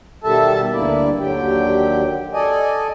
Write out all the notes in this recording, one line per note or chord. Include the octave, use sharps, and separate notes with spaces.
B2 D#3 G3 A4 E5 A5
D2 G2 A#3 E4 D5
D#2 D3 F#3 G4 G5
A4 D5 D#5 G#5